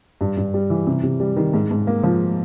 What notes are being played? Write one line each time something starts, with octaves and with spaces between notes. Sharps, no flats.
G2
G2
G3
E3
C3
C3
G3
D#3
G#2
G#2
A#3
F3